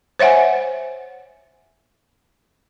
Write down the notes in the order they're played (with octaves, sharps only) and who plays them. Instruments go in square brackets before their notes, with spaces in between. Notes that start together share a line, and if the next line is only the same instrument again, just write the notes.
[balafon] C5 C#5 E5 F#5 G#5